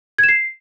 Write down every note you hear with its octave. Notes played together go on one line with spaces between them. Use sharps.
G#6
E7
C7